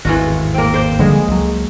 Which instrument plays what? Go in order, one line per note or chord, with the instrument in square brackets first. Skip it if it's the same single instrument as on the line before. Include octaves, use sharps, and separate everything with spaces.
[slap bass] G#1 E2 A2 [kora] E3 F4 F#4
[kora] A#3 C4
C5 D5
[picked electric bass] D3 F3 G3 [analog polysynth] G#3
[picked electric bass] C#2 F#3